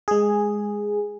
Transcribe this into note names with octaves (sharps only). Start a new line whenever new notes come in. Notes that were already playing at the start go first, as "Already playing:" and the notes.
G#3 G#4